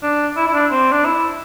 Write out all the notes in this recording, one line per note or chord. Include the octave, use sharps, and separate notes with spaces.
D4
E4
E4
D4
C4
D4
E4